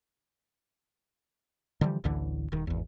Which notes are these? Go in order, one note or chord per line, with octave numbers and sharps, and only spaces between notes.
D3 E3 F3 G3
A1 D2 D3 E3
D#1 D#3
G#1 E2